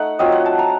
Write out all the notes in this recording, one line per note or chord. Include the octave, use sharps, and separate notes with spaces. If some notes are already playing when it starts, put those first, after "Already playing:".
Already playing: A3 D#4 F#5
F#3 C4 F4 D#5
F#5
A5
A#5